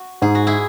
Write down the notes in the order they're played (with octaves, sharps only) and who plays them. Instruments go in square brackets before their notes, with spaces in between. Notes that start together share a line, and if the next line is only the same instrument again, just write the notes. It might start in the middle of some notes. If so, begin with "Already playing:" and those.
Already playing: [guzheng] F#4
[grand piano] G#2 [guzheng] G#4
[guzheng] F#4
E4 G#4